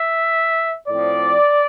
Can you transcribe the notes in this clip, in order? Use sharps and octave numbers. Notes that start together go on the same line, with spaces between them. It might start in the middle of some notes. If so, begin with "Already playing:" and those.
Already playing: E5
A2 F3 C4 D5